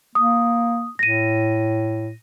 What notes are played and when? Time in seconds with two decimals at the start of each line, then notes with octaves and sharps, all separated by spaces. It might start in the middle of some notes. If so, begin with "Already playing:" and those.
0.15 A#3 D#6
0.99 A2 A#6 D#7